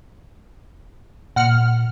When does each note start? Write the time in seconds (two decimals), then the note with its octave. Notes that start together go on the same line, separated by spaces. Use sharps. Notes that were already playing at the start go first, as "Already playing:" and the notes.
1.36 A#2 F#5 F6 C#7